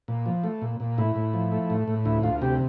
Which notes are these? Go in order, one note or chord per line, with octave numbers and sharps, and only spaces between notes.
A#2
F3
A3
A#2
A#2
A2 E4
A2
F3
A3
A2
A2
D2 E4
D2 F4
C3 G4